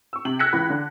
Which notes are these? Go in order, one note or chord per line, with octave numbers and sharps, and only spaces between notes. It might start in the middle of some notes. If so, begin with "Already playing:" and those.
C#6 E6
C3 G5 F#7
E6 F#6 G#6 A#6 B6 C#7
C#2 E3 B5
D3